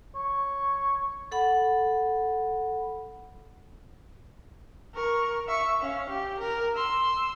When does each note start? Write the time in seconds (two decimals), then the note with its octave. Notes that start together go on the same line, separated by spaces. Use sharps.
0.15 C#5
1.31 A4 F#5 B5
4.94 A#4 C#6
5.47 E5 C#6
5.81 C#4 F5
6.10 G4
6.40 A#4
6.76 C6 E6